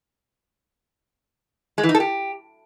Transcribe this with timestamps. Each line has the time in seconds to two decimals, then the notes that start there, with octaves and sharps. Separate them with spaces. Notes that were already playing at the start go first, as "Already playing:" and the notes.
1.78 G#3
1.83 E3
1.89 D#4
1.94 A4
2.00 G4